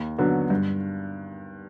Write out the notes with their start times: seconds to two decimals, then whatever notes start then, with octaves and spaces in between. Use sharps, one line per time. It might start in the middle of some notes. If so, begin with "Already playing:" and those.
Already playing: D#2
0.18 D3 F#3 B3
0.50 G2